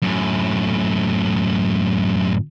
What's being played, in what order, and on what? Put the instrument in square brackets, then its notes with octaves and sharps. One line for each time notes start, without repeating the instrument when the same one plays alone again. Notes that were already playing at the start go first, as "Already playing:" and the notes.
[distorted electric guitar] F#2 A2